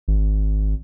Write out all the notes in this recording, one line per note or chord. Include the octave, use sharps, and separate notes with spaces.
G#1